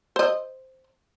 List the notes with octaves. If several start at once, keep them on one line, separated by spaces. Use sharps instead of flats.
C5 D#5